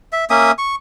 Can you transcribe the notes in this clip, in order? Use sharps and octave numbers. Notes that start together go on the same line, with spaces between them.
E5
A#3 C#4 E5 D#6
C#6